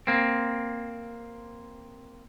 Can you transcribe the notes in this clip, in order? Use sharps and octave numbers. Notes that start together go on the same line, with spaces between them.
A#3 C4